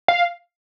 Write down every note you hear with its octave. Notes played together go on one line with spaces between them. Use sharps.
F5